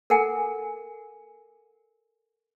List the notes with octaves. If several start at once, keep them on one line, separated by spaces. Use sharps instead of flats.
A4 A#4 F#5 G#5